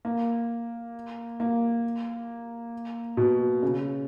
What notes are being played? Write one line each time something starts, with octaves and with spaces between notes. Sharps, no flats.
A#3
A#3
B2
C#3